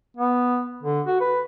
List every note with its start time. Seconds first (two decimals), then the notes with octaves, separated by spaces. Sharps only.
0.17 B3
0.83 D3
1.07 F#4
1.20 B4